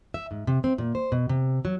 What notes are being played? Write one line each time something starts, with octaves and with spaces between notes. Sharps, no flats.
E5
G#2
C3
C4
A#2
C5
B2
C3
F#3